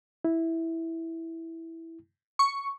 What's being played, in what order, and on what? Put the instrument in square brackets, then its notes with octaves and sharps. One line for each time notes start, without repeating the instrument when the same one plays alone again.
[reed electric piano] E4
[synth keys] C#6